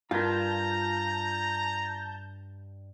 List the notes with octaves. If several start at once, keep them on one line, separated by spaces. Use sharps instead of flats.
G2 F4 A#4 A5 A#5 G6